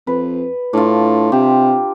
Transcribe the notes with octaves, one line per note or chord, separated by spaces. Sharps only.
F2 B4
A2 D4 F4
C3 G4